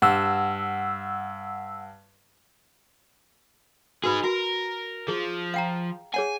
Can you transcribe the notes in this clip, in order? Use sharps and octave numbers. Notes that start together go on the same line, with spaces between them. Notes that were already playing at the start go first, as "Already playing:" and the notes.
G2 F#5 E6
D#4 F#4 G#4 B4 B5
F#4 A#4
F3 G#4
F5 G5 A#5
G#4 C#5 F#5 G#5